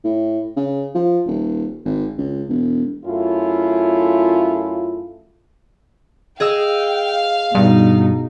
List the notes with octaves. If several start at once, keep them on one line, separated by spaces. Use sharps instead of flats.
A2
C#3
F3
D#1
G#1
C#2
E1
F#2 A3 C#4 E4 F4
G#4 D#5 F5 G5 E6
G2 B2 D#4